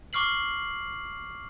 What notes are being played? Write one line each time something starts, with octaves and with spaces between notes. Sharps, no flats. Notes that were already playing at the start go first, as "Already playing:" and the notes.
C#6 D6 F6 C7 F#7